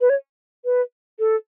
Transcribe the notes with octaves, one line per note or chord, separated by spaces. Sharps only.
B4
C#5
B4
A4